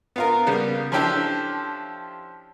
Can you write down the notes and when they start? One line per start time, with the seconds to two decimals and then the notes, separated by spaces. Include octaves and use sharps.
0.16 B3 F4 A#4
0.47 C#3 G3 A#3 B3
0.92 F3 C#4 D4 E4 G4 A4